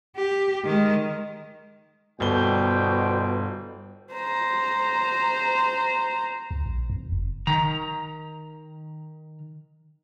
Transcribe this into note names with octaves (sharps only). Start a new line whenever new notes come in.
G4
D#3 G#3
G1 B2 C5 D5 G5 G7
C5 A#5
D2
A#1
F2
F#1
D#3 A#5